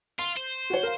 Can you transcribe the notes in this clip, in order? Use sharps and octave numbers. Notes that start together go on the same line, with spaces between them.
F4 C6
C5
F#4 C#5
A#4 F5